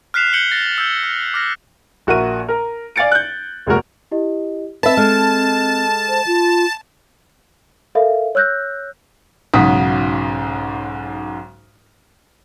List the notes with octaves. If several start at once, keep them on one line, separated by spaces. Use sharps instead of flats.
F6 F#6 B6 C7 E7 F7
F6 G6 C#7 F#7 G7
A6 A#6 G7
E6 G6 G7
F6
D6 F6 A#6
A#1 F#4 A#4 E5 D#7
A#4 A#5
D5 F5 G#5 A6 C#7 D7
F#6 G6
F1 G#3 A#3 F#4 A#4
E4 G4 D#5
C4 B4 D#5 E5 A5
G#3 A4 D#5 F6
C5
F4
A4 A#4 E5 F5
C#5 E6 F#6 G6 A#6
B1 G#2 C#3 F#4 D#6 B6